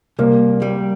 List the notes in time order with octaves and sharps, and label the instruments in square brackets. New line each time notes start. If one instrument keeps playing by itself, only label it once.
[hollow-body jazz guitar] C2 [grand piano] A#3
[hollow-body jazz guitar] G3